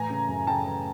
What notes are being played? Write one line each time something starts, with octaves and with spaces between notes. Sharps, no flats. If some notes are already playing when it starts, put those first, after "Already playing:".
Already playing: A2 E3 G#5 A#5
C#3
F#2
C#3 G5 A5
E3